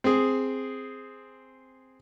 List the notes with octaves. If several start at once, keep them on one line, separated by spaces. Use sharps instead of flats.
C4 G#4